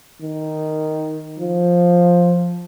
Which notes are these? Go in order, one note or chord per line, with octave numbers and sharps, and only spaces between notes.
D#3
F3